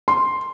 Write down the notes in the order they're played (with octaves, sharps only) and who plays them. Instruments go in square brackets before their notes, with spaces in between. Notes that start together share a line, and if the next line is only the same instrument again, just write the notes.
[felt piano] C6